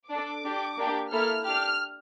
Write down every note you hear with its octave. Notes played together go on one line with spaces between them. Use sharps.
D4 A4 D6
D4 G4
A#3 D4 G4
A#3 E4 A4 F6
D4 G4 F6